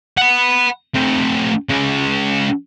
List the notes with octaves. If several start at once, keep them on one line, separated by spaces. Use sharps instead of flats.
F#5 B5
A3 C4
G#3 C#4